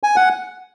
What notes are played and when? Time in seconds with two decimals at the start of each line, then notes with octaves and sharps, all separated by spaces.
0.03 G#5
0.16 F#5